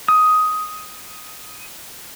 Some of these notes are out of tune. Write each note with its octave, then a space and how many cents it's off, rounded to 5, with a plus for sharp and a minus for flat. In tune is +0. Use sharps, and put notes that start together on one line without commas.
D#6 +10